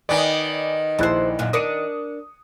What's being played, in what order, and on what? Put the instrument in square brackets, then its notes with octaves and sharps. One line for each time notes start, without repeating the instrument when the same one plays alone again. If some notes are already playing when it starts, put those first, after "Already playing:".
[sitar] D#3 B3 [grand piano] D5 G#5
[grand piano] A#1 E4 F#6 [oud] A4 C5
[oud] F#2 A#2 F#3
[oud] D4 A#4 D5 [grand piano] D#6 C#7 D#7